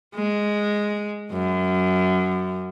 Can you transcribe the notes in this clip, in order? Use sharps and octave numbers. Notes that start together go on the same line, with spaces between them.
G#3
F#2